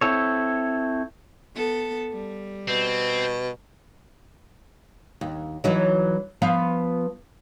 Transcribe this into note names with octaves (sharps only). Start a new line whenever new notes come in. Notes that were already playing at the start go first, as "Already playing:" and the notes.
C4 E4 A4 C#5
B3 A4
G3
B2 C4
D#2
E3 F#3 D#4
F3 B3 F5